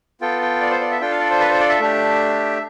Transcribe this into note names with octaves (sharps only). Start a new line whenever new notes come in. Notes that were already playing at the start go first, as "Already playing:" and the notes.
B3 F4 A4 G5
G5
D5
C5
D5
E5
D4 F4 A4 G5
F5
D5
C5
B4
C5
D5
E5
A3 D4 G4